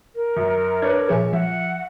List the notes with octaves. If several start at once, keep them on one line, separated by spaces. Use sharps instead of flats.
A#4
F#2
D4 B4 C#5 G#6
A#2 F3 G#4 C#5 E5 G#5
F3 E5 F#5